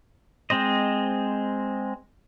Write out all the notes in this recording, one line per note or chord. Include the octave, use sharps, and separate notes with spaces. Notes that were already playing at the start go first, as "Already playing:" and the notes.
G#3 C4 C5 D#5